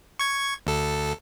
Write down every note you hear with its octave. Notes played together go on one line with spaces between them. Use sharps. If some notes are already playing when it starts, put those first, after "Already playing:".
C#6 G#6
D2 A4